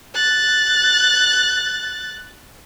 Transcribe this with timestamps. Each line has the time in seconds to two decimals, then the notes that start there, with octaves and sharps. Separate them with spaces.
0.14 F#6 A6